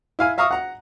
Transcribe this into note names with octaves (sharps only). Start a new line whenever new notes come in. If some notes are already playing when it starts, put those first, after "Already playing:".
E4 F5 G#5
E5 F5 A#5 C#6 D#6
F#5 A#5